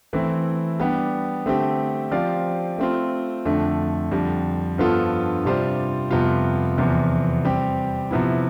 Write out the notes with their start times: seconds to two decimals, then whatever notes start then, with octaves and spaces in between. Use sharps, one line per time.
0.13 E3 A3 C4 E4
0.79 G3 B3 D4 G4
1.46 D3 A3 C4 G4
2.11 F3 C4 G4 D5 F5
2.78 A3 C4 F4
3.45 F2 D3 A3 D4
4.11 F2 D3 G3
4.78 G2 F3 B3 F4 A4
5.45 C3 G3 D4 F4 C5
6.11 F2 C3 G3 B3 F4
6.78 E2 C3 F3 B3
7.45 G3 C4 G4
8.11 C3 F3 B3 E4